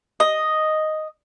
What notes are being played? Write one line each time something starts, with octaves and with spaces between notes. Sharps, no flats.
D#5